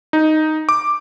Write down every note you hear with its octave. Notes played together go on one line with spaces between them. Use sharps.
D#4
D6